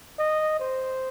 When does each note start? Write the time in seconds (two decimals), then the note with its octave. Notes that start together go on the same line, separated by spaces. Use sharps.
0.19 D#5
0.60 C5